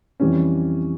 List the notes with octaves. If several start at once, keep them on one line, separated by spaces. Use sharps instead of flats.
F2 E3 G3 C#4